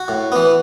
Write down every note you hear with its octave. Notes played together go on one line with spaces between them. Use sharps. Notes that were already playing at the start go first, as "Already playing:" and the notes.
Already playing: F#4
A2
E3 B3